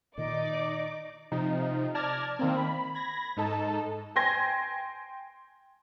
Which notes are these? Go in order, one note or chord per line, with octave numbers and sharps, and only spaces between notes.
A#2 D#3 D#4 D5 D#5 D6
C3 F3 D#4
D5 A5 F6 G#6 A#6
D#3 A#3 C4
B5
B5 G#6 A#6
G#2 D#4 A4 A5
G5 G#5 C6 G#6 A#6